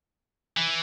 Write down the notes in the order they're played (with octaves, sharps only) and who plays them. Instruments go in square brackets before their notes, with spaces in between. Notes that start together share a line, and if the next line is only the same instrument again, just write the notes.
[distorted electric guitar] E3